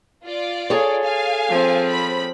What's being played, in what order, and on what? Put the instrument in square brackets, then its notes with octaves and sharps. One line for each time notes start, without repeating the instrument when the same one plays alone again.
[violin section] F4 D5
[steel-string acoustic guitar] G#4 A4 C#5
[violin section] F5 G#5
[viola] F3 C4
[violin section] B5